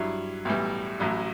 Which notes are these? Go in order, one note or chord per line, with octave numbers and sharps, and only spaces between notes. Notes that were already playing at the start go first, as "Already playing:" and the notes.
Already playing: G2 F#3 E4
B1 A2 E3 G3
A1 A2 F#3